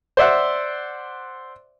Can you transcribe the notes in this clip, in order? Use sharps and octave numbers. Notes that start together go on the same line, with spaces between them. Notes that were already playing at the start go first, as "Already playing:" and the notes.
C5 D5 E5 F#5